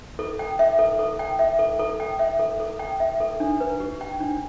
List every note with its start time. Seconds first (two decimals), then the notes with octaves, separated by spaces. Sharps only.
0.19 A4
0.39 G5
0.59 E5
0.79 A4
0.99 A4
1.19 G5
1.39 E5
1.59 A4
1.79 A4
2.00 G5
2.19 E5
2.39 A4
2.60 A4
2.79 G5
3.00 E5
3.20 A4
3.40 D4
3.60 B4
3.80 G4
4.01 G5
4.20 D4